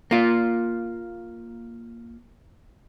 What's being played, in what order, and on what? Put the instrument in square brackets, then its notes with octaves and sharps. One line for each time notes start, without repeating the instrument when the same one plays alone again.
[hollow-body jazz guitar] A#3 F4